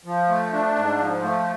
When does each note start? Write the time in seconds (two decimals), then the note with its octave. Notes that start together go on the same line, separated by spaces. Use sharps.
0.05 F3
0.29 A3
0.53 D4
0.75 G#2
0.99 F3
1.22 A3